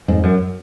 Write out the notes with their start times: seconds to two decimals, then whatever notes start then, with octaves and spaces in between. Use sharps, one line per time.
0.08 F2 G#2
0.24 F#2